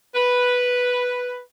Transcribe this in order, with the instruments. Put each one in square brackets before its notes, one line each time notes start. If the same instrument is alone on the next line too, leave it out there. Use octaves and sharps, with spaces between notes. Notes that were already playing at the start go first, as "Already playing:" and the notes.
[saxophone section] B4